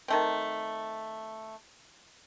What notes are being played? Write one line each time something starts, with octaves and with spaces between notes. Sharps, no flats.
D#3 A3 C4